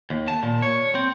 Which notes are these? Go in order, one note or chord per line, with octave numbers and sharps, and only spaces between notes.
D#2
A5
A#2
C#5
C4